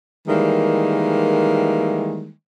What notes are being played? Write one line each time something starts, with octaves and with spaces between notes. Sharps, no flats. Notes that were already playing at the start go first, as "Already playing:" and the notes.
D#3 E3 G3 G#3 A#3